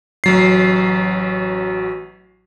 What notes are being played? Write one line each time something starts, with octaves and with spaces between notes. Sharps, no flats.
A1 F#3 C7